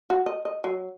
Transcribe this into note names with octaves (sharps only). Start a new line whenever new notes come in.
F#4
D#5
D#5
F#3